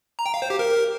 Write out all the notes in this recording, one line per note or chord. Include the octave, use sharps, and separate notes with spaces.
A#5
G5
F5
C5
G4
A#4